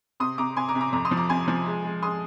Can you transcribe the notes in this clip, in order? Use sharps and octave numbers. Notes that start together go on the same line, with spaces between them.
C3 C6 D#6
C3 A#5 D6
C3 G#5 C6
A#5 D6
C3
A#5 D6
F2 A#5 D6
C6 D#6
F3
A#5 D6
C3 G#5 C6
F3
G#3
G#3
G#3 C6 D#6